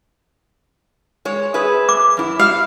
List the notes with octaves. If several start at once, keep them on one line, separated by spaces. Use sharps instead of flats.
G#3 C#5
G#4 B4 E5
D6
F#2 E4
F5